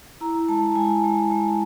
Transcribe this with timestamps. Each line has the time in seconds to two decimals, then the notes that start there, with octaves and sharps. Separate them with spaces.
0.21 E4 A#5
0.48 G#3 A5
0.76 G#3 G#5
1.04 G#3
1.31 G#3